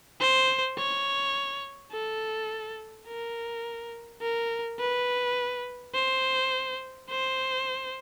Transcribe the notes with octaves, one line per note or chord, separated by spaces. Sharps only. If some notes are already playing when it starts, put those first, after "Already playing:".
C5
C#5
A4
A#4
A#4
B4
C5
C5